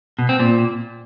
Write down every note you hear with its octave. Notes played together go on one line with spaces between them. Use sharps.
B2
C4
A#2